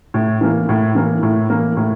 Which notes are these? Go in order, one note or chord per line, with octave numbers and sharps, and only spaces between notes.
A2
E3 A#3
A2
E3 A#3
A2
E3 A#3
A2